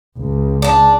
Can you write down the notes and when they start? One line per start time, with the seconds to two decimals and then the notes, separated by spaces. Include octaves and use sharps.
0.18 C#2
0.62 D4 A5